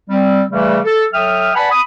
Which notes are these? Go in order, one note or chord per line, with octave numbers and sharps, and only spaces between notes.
G3 C4
C#3 E3 G3 A3
A4
F#3 A4 E5 G5 D#6 F6
B4 D5 F#5 G#5 A5 B5
B5 D#6